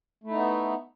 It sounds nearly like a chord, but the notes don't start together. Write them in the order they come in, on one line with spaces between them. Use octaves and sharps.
A3 E4 D#4 B3